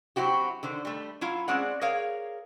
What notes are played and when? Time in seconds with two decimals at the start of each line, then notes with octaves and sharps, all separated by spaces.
0.16 F#3 C4 E4 F#4 G4
0.63 D3 D#3 C5
0.85 G3 A3
1.21 F#3 E4 F4 F5
1.48 G#3 C4 C#4 G#4 D5 F#5
1.81 G#4 A#4 C#5 F5